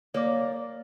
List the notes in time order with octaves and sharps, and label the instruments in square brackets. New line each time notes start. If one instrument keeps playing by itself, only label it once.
[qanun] A#3 [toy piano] C#5 D6 [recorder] D5